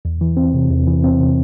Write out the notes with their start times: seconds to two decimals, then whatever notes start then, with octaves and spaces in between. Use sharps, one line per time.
0.05 E2
0.21 E3
0.37 C4
0.54 C3
0.71 E2
0.87 E3
1.04 C4
1.20 C3